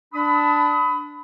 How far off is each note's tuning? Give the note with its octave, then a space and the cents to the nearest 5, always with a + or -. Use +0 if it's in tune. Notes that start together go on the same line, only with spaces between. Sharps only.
D4 +0 B5 +25 D#6 +30